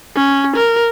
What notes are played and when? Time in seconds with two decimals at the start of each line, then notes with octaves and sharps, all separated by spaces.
0.16 C#4
0.56 A#4